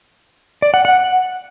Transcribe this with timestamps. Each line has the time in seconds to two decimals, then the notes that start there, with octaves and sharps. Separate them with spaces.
0.62 D5
0.74 F#5
0.85 F#5